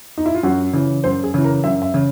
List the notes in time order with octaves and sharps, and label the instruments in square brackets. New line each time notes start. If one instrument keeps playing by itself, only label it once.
[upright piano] D#4
E4
F4
F#2 F#4
C#3 E3
F#2 C5
G#4
C#3 E3
A#4
F#2 E5
E5
C#3